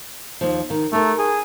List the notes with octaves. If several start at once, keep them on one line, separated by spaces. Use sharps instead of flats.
D#2 F3
D#3
A3 G4 A#4
G#4